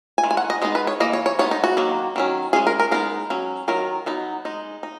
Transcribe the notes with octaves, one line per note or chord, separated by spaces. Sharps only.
G#5
D#3 G#3
G#5
F#5
D#5
G#3 B3 D#4 D#5
B4
C#5
E3 A#3 D#5
C#5
C#5
G#3 B3 D#4 C#5
D#4
F#4
D#3 F#3 A#3
D#3 F#3 C#4
G#3 C#4 G#4
A#4
A#4
G#3 B3 D#4 A#4
F#3 C#4
D#3 F#3 A#4
F#3 B3 D#4
G#3 D#4
D#4